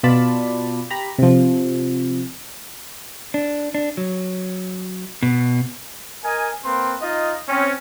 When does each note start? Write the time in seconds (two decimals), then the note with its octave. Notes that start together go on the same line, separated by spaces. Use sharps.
0.03 B2 F4 D5 A5 B5
0.90 G4 A#5 B5
1.19 C3 F3
3.34 D4
3.75 D4
3.97 F#3
5.23 B2
6.24 A#4 D#5 G#5
6.65 A#3 C4 B4 C6
7.02 D#4 F4 D#5
7.48 C4 C#4